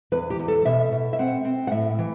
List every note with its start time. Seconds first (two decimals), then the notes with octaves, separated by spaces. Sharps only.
0.12 E2 B4
0.30 G4
0.39 E2
0.48 A4
0.65 B2 E5
0.92 B2
1.13 E5
1.19 C4 F#5
1.45 C4
1.67 F#5
1.71 A2 E5
1.99 E3